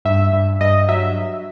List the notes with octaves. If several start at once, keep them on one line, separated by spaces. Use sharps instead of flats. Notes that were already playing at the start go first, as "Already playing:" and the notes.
G2 E5
G2
G2 D#5
F#3 E5